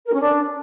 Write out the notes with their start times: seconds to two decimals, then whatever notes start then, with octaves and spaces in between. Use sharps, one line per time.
0.06 A#4
0.13 C#4
0.21 D4